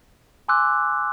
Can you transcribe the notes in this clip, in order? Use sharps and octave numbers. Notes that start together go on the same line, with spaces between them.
G#5 C6 D6 E6 F#6